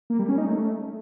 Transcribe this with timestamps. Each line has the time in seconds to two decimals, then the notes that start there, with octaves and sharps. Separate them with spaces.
0.10 A#3
0.19 G3
0.29 C#4
0.38 D#4
0.47 A3